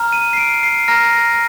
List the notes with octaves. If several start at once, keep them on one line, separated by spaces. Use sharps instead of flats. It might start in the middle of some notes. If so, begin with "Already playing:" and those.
Already playing: A#5 F6
D#7
C7
D7
C7
A#5 F6 A#6
A#6